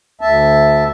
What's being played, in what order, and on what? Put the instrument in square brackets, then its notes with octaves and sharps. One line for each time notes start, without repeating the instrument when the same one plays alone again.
[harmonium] D2 E5 A5